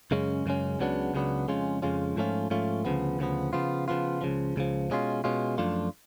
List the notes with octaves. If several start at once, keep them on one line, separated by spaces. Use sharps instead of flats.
F#2 C#3 G#3 C#4
F#2 C#3 G#3 C#4
C#2 C#3 F#3 B3 D4
C#2 C#3 F#3 B3 D4
F2 C#3 G#3 C#4 F4
F2 C#3 G#3 C#4 F4
G#2 F3 A3 C#4 F4
G#2 F3 A3 C#4 F4
D2 C#3 F3 B3
D2 C#3 F3 B3
C#3 F3 B3 F4
C#3 F3 B3 F4
C#2 C#3 F3
C#2 C#3 F3
B2 G#3 C#4 F4
B2 G#3 C#4 F4
F#2 F3 A3 D4 F4